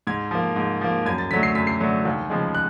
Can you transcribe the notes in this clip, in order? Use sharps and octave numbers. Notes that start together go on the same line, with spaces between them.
G#2 G#6
F3 A#3
G#2
F3 A#3
F#2 G#6
A6
D3 F#3 A3 B6
C7
F#2 B6
C7
D3 F#3 A3
D#2
C#3 F3 G#3
F#6